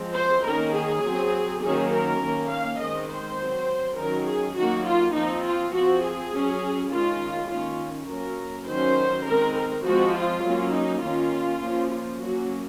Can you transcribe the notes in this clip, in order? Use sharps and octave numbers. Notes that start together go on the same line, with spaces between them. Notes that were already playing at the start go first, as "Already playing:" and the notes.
Already playing: F3 G#3 C4
C5
D#3 A#3 C#4 A#4
G#4
F#3 C4
D#3 F#3 A#3 C#4 G#4
A#4
D#3 A#3 C#4
F5
D#3 G#3 C4 D#5
C5
F#3 C4
D#3 F#3 C#4 A#4
G#4
D#3 F#3 A#3 F#4
F4
F3 C4 D#4
F4
F3 C4 F#4
G#4
F#3 C#4
D#3 G#3 C#4 F4
D#3 A#3 C#4 F4
F#3 A#3 C#4 A#4
D#3 F#3 C#4 C5
D#3 G#3 C4 A#4
A#4
F3 G#3 C4 F#4
F4
F#3 A#3 C#4
D#4
D#3 A#3 C#4 F4
F3 A#3 C#4
F4
F#3 A#3 C#4 F#4